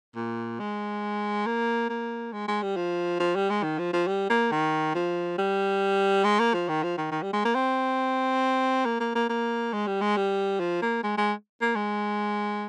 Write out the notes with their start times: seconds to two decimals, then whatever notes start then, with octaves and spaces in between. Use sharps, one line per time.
0.16 A#2
0.60 G#3
1.47 A#3
1.90 A#3
2.33 G#3
2.48 G#3
2.63 G3
2.77 F3
3.20 F3
3.36 G3
3.50 G#3
3.64 D#3
3.79 F3
3.93 F3
4.08 G3
4.30 A#3
4.52 D#3
4.95 F3
5.38 G3
6.25 G#3
6.39 A#3
6.54 F3
6.69 D#3
6.83 F3
6.98 D#3
7.12 D#3
7.22 G3
7.33 G#3
7.45 A#3
7.55 C4
8.85 A#3
9.00 A#3
9.15 A#3
9.29 A#3
9.73 G#3
9.87 G3
10.01 G#3
10.17 G3
10.60 F3
10.82 A#3
11.04 G#3
11.18 G#3
11.61 A#3
11.76 G#3